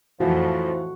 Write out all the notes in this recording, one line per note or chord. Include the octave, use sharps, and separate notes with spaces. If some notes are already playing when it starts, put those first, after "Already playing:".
F2 A2 E3 F3 F#4